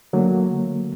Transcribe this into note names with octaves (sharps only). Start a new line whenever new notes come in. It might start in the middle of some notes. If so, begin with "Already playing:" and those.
D3 F#3 A3 A#3